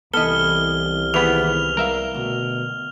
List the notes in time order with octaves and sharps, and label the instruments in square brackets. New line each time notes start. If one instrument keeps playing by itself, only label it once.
[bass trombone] C2 [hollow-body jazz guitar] E3 B3 [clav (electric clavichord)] A4 D#5 [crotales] F6 G7
[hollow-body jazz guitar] D#2 G#4 B5 [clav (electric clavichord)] E3 B3 [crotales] F7
[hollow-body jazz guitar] G3 [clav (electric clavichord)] A#4 E5 F5
[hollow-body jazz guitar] D2 [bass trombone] B2